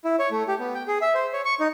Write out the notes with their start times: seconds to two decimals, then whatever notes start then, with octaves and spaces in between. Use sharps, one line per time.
0.04 E4
0.19 C#5
0.31 A3
0.48 G4
0.59 B3
0.74 G5
0.88 G#4
1.01 E5
1.15 C5
1.33 C#5
1.45 C#6
1.60 D#4